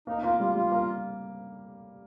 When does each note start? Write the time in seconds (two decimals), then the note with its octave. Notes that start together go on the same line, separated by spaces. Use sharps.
0.07 A#3 D#4
0.23 A#3 F4
0.39 G3 F4
0.55 G3 F4
0.72 A#3